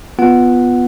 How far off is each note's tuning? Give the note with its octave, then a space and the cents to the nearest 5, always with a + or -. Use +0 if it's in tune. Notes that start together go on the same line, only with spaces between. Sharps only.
B3 +0 F4 +0 F#5 +0